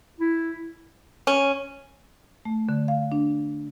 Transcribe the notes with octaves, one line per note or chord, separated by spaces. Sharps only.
E4
C#4
A3
D3
F5
D4